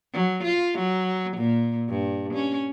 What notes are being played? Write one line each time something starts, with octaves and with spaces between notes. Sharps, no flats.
F#3
F4
F#3
A#2
G2
C#4